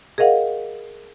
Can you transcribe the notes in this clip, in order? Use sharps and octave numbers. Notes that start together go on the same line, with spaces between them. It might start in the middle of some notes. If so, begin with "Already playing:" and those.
G#4 A#4 D#5 F5 F#5